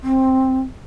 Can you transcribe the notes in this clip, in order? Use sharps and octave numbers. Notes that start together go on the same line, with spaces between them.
C4